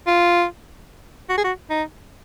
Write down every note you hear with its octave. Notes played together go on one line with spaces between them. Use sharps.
F4
F#4
G#4
F#4
D#4